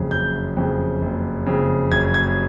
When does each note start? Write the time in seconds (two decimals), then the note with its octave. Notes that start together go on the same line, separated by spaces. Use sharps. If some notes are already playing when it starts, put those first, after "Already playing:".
Already playing: F#1 F2 C#3
0.11 F#1 G6
0.57 F2 C#3
1.01 F#1
1.46 F2 C#3
1.91 F#1 G#6
2.14 G#6